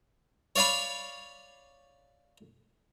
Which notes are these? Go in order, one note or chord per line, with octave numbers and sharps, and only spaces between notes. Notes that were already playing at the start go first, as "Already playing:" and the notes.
C#5 D5 F5 G#5 B5